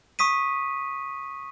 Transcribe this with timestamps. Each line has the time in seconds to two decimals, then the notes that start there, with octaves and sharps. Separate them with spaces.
0.19 C#6 D#6 B6 D#7